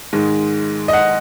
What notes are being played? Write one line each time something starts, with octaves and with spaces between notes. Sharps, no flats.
G#2 D#3 G#3
D#5
F#5